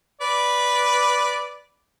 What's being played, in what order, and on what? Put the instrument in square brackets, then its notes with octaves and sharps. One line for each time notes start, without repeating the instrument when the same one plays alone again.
[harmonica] B4 D5